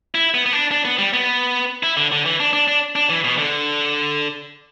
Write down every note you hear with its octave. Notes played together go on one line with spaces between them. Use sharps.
E4
B3
B3
D4
D4
B3
G3
B3
E4
D3
D3
E3
D4
D4
D4
D4
E3
B2
D3